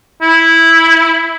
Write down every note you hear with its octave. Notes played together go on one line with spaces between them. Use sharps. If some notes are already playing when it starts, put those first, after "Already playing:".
E4